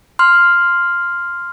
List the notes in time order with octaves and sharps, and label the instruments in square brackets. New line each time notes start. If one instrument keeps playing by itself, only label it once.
[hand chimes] C6 F6